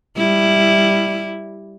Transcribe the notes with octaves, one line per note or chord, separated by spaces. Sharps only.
G3 E4